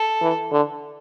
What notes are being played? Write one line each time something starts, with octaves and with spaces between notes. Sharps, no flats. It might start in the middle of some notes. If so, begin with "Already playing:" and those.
Already playing: A4
E3
D3